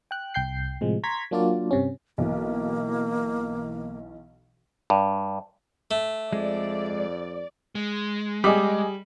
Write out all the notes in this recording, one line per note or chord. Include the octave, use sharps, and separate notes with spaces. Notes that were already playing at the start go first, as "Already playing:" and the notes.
G5 F#6
C2 G5 G6 C7
A2 C3 F3 G#3
A#5 C6 C#6 G#6 B6
F#3 A#3 D4 F4 F#4 D5
G2 C3 C#4
B1 E3 A#3
G2
A3
F2 G#3 D5
G#3
G3 G#4 D#5 D6